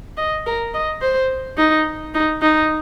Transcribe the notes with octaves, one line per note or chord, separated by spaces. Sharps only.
D#5
A#4
D#5
C5
D#4
D#4
D#4